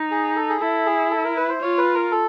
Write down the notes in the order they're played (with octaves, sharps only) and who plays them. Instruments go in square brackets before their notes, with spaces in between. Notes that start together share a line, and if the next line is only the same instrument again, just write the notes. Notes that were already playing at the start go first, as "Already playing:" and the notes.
Already playing: [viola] D#4
[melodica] G#4
A4
G#4
[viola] E4 [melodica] A4
[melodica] G#4
A4
A#4
B4
C5
[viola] F4 [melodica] C#5
[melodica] B4
A#4
A4